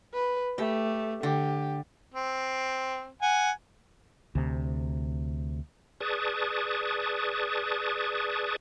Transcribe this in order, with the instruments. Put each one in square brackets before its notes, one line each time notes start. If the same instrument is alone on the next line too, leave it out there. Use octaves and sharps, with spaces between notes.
[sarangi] B4
[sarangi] A3 [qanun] G4
[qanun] D3 [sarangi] G4
[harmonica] C4
F#5 G#5
[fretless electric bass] D2 C3
[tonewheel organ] G#4 B4 D5 A5 C#6 D#6